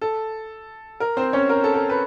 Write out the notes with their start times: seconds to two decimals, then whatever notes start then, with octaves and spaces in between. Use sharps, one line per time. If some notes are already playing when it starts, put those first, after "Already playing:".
0.02 A4
1.00 A#4
1.17 C4 C5
1.33 C#4 C#5
1.49 A#4
1.64 A4
1.74 A#4
1.89 B4